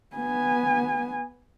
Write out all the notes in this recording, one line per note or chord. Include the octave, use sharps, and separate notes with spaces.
B3 G#5